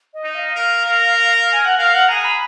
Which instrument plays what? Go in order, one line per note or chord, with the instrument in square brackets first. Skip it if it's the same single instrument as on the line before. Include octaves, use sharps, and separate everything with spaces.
[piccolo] D#5
[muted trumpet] D#4
[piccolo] F5
[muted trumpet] A#4
A#4
[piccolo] G#5
F#5
[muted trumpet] A#4 [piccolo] F5
[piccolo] F#5
[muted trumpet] G#4 [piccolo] A#5
[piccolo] B5